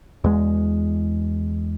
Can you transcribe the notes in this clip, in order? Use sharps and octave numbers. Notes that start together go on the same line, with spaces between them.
E2 G#3